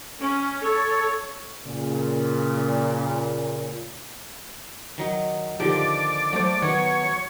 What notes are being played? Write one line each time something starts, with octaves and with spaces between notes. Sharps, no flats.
C#4
A4 C#5
A#2 C#3
D#3 F#3 D#4
D3 D#3 F3 G4 D5
F#3 A3 C5
D#3 F#3 B3 C#5